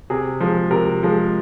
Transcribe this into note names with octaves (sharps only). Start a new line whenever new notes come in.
C3 G#4
F3 G#3
C3 A#4
F3 G#3